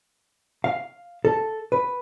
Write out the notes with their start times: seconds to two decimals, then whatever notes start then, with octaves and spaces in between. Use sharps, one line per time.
0.64 F5
1.25 A4
1.72 B4